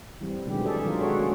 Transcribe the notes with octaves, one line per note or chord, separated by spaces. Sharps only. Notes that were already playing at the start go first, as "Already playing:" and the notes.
E3 G3 C4
B2 D3 D#3 F#3 G#3 G4
G#4 A4 D5 E5
D#3 F#3 B3 F4 A#4
G#3 F#4 A4 C#5
A3 A#3 C#4 F#4 G#4